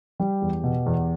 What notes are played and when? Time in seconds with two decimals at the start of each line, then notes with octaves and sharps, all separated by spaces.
0.20 G3 G4
0.42 E2
0.64 B2
0.86 E2